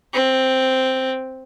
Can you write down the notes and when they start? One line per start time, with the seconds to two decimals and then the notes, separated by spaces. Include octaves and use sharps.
0.14 C4